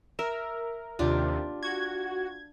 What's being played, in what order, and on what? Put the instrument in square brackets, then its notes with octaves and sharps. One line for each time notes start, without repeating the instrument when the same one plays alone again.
[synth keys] A#4 [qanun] E5
[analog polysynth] D#2 C3 [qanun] D4 F4 G4
[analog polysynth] F#4 [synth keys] G#6